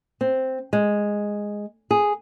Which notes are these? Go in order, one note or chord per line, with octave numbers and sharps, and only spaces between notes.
C4
G#3
G#4